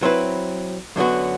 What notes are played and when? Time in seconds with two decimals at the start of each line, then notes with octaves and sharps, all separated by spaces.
0.02 F#3 C4 E4 B4
0.96 F#2 D3 F#3 B3 F#4